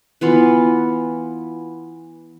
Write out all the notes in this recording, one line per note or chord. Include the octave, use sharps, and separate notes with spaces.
E3 B3 F4